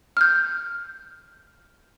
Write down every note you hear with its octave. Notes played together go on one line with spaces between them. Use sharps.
F6 G6